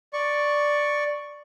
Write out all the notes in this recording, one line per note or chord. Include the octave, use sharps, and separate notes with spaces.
D5 C#6